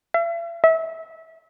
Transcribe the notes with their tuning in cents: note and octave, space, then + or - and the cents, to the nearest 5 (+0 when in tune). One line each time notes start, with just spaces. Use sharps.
E5 +45
E5 -25